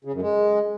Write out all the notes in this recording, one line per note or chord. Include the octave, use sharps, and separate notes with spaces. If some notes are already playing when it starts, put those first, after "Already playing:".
C#3
F#2
G#3